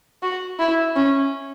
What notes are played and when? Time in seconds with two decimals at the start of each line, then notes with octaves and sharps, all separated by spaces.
0.23 F#4
0.59 E4
0.96 C#4